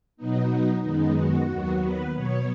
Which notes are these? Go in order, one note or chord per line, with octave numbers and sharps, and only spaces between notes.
B2 F#3 B3 D#4
F#2 D#3 G#3 B3 D#4
F#4
D#2 D#3 F#3 B3
B4
B2 F#3 B3 C#5